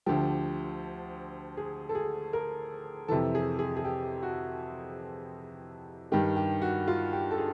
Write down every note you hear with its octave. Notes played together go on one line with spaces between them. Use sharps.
D2 D3 F3 G4
G#4
A4
G#4
A#4
F2 C3 E3 A4
G#4
G#4
G#4
G4
F#4
G2 D#3 G4
G4
F#4
F4
G4
A4
G#4